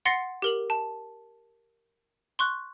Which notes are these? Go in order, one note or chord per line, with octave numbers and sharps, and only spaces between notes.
F#5 C6 A6 A#6 C7 C#7
G4 A#4 F#7
A5
C6 C#6 F#6